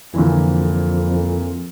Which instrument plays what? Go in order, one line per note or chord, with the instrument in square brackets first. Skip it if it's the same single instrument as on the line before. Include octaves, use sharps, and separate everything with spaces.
[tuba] F2 [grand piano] A#2 D3 E3